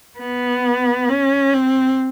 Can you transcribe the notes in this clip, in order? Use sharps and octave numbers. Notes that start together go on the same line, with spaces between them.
B3
C#4
C4